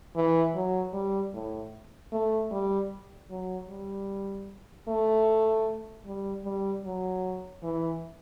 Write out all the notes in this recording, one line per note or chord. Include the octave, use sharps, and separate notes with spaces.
E3
F#3
G3
A2
A3
G3
F#3
G3
A3
G3
G3
F#3
E3